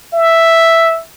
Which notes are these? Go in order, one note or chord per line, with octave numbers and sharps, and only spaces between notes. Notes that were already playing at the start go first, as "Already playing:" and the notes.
E5